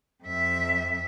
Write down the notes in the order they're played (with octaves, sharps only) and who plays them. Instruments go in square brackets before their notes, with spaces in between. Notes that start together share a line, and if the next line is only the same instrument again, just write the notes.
[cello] F2 E5